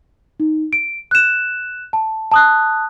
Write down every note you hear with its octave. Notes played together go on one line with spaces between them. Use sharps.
D#4
D7
F#6 E7
A5
A5 D#6 F#6